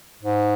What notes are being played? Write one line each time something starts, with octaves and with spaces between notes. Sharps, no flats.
G#2